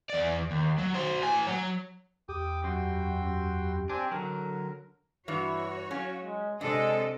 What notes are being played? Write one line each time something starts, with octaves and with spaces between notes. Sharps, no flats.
E2 D5
D#2
F#3
F#4 C5
A2 G#5
F#3 C#5
E2 G4 G5 D6 D#6
F#2 F#4 G5 C6
C4 D4 G4 G#5
D3 F#3 A#4
G2 E3 E4 F#4 C#5
F#3 C#4 F5
G#3
C3 G#3 D4 A4 D#5